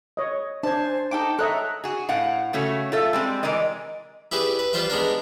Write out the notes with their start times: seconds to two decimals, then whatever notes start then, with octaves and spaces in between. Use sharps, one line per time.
0.17 C#5 D#5
0.63 D4 C5 G#5 A5
1.11 D#4 A4 G5 D6
1.39 A4 C#5 D#5 E5 A#5 F#6
1.84 F#4 G#4
2.09 A2 F5 F#5
2.53 C#3 A3 C#4 F#4
2.92 F4 A4 E5
3.13 G3 G#3 C4
3.43 E3 G#3 A#4 D5 D#5
4.32 E4 G4 G#4 B4 D5
4.59 B4
4.73 G3 F4 B4 C5 E5
4.90 G#3 B3 D4 A#4